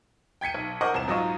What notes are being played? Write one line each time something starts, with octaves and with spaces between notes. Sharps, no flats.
G5 G#6 B6 C#7 D#7
B1
A#4 C5 D#5 F#5 C#6 D6
E1 C2 A#5 E7
G#2 F#3 F4 D#5 C#6